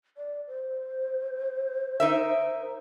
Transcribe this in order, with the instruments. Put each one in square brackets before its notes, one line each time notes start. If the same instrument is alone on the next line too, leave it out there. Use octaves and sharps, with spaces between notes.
[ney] D5
C5
[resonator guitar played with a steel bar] D#4 A#4 E5